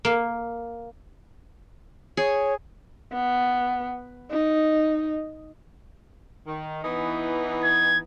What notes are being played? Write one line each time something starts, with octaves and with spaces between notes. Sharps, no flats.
A#3
G#4 C#5
B3
D#4
D#3
E3 B3 D#4
G#6